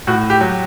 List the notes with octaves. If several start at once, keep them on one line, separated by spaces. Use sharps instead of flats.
A2 F#4
G4
F#3